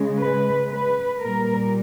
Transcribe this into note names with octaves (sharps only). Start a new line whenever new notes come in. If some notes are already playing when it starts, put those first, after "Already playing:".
Already playing: C#3 G#3
B4
B4
A#2 G3 A#4